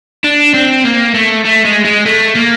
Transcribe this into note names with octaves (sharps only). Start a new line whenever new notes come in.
D4
C4
A#3
A3
A3
G#3
G#3
A3
A#3